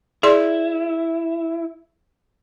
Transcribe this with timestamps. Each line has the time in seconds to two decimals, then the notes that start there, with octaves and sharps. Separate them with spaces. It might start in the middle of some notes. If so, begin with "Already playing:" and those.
0.23 E4 G#4 D5 C6